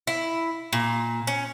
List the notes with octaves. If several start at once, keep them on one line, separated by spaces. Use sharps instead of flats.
E4
A#2
C#4